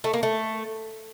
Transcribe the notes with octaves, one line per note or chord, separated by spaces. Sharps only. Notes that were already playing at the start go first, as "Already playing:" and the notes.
A3
A#3
A3